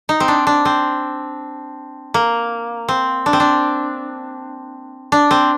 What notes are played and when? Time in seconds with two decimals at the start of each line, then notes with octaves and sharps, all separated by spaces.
0.09 D#4
0.20 C4
0.28 D4
0.47 D4
0.65 C4
2.14 A#3
2.88 C4
3.26 D4
3.33 C4
3.40 D4
5.12 D4
5.31 C4